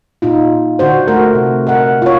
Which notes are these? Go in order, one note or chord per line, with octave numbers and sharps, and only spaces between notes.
A#2 D#4 F4
D3 D4 F#4 C5
A3 F#4 A#4
C3
A#4 D#5 F#5
F4 C#5